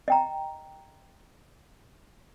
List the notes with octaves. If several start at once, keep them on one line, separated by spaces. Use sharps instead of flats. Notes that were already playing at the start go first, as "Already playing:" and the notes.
D#5 G5 A#5